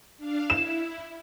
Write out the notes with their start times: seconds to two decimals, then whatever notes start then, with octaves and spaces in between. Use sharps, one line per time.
0.17 D4 F5
0.50 E4 E7